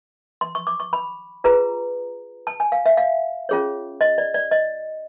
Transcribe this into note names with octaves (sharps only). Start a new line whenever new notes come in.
C6
C#6
D6
C#6
B5
F4 G#4 B4 A#5
A5
G#5
F5
E5
F5
C#4 F4 G#4 C#5
D#5
D5
D5
D#5